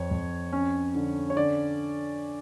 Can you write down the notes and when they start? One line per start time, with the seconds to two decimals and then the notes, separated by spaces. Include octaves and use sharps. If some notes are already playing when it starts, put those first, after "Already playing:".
Already playing: F2 C#5
0.11 F2
0.53 C#4
0.95 D3
1.30 C#5
1.36 D3 D5